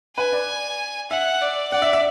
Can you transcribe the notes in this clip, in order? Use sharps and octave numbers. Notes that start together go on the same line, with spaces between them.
B4 G#5
D5
E5 F#5
D5
D5 F#5
E5
E5